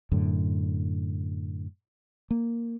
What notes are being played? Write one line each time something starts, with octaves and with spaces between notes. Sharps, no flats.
F#2 A2 D3
A#3